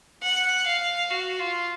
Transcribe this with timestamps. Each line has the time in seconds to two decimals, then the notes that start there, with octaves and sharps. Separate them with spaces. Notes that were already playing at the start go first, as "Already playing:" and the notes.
0.23 F#5
0.66 F5
1.10 F#4
1.40 F4